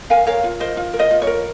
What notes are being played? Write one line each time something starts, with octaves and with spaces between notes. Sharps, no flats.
A#4 F5 G#5
A#4 C#5 F5
F4
A#4 C5 D#5
F4
A#4
C5 D#5
F4
C#5
A#4